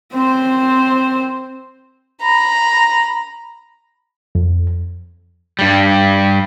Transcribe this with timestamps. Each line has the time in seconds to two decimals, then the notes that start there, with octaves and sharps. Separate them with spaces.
0.12 C4 C5
2.22 A#5 B5
4.35 F2
5.59 G2 G3